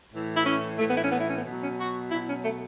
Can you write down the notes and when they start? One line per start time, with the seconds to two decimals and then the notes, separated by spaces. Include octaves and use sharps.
0.12 A2 E3
0.35 E4
0.45 C#4
0.79 A2 E3 A3
0.87 B3
0.95 E4
1.04 C#4
1.12 B3
1.20 E4
1.28 C#4
1.36 B3
1.45 B2 F#3
1.61 C#4
1.78 F#4
2.11 B2 F#3 E4
2.28 C#4
2.44 A3